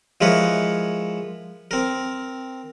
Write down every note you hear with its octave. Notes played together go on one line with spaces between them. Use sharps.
F3 G#3 E4 A#4 B4 C#5
C4 A#4